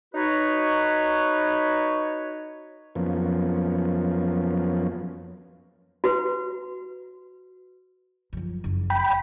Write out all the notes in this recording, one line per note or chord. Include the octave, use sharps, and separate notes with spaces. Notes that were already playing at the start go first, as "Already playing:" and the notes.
D#4 F#4 B4 C#5
F2 F3 F#3 A#3 B3 C#4
F#4 B4
F#2 F3
F#1
G5 B5